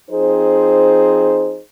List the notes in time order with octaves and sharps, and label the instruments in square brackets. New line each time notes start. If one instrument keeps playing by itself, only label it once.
[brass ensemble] F3 C4 D#4 G#4 C5